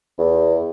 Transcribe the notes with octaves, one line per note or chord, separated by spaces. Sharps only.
E2